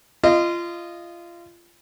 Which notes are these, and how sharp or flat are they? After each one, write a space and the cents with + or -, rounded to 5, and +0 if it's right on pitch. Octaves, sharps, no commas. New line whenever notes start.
F4 -25 D#5 -15